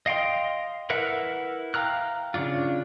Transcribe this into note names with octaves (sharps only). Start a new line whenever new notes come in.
D#5 F5 G5 C6
E4 A#4 B4 E5 F#5
F5 G5 A#5 F6 F#6
C#3 F3 D4 F4